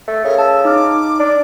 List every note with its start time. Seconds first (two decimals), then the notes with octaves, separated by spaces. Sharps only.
0.07 A3
0.24 C#3 A#4
0.38 A5 E6
0.65 D#4 D6 F6
1.19 D4